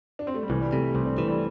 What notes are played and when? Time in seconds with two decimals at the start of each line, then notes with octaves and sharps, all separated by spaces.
0.19 D4
0.27 C4
0.34 A3
0.43 G3
0.50 C2 E3
0.61 G3
0.73 C3 A3
0.95 C2 C4
1.06 D4
1.18 E3 A3
1.28 G3